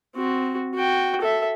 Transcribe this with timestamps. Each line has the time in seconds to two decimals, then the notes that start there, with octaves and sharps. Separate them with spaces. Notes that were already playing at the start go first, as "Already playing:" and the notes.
0.15 C4 F#4
0.75 F#4 G5
1.21 A4 E5